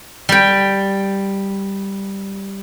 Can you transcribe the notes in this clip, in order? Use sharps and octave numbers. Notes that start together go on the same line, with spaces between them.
G3 G5